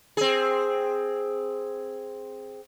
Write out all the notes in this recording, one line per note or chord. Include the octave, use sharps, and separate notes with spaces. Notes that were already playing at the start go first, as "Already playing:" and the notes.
C4 G#4